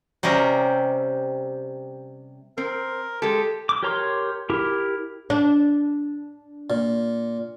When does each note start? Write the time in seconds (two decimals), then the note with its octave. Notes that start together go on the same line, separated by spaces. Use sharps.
0.23 C3 G3 C#4 A#4 E5
2.58 C4 A#4
3.22 G#3 G4 A4
3.69 D6
3.83 G4 A#4 C#5 A#5 C6
4.50 E4 G4 A#4
5.30 D4
6.70 A#2